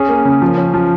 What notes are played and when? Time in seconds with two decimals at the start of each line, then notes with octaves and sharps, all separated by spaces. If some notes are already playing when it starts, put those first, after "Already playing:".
Already playing: C#4 G#4
0.09 A#3
0.25 C#3
0.42 F3
0.58 C#4
0.74 F3